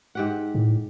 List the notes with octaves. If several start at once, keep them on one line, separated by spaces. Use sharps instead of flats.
G#2 G4 F#5
A2